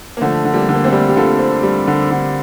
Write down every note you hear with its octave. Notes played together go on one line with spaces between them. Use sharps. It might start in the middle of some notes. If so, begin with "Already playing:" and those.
A#3
D3 F3 A3
D3
G3 A#3
D3
A#3
A3 C4
G3
G4
D3 F4 A4
C4
G3
D3
D3